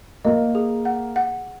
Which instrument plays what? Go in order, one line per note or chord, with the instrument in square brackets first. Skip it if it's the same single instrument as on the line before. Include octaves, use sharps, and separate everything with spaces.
[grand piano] A#3 [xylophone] D#5
[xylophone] G#4
F#5
F#5